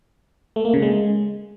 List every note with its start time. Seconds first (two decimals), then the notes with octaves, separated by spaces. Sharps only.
0.56 A3
0.65 A#3
0.74 C#3
0.82 G#3